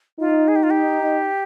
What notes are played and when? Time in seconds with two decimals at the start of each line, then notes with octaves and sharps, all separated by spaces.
0.19 D#4 F4
0.48 G#4
0.56 G4
0.63 F4
0.70 G4